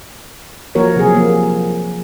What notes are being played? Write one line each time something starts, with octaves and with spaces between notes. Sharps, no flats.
F3 A#3 F#4 A#4 C#5
C3 F#3 G#4
F3 A#3